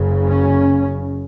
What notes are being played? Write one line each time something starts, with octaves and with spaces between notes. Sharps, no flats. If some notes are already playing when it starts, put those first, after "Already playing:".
Already playing: F#1 F#2 C#3
C#4